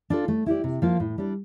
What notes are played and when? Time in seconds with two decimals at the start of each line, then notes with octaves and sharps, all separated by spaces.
0.10 D4 F4 A4
0.28 A3
0.46 E4 G4 D5
0.64 C3
0.82 F3 A#3 F4
1.00 A2
1.18 G3 D4